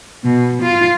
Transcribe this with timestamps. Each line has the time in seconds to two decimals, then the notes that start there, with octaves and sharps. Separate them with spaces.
0.24 B2
0.62 F4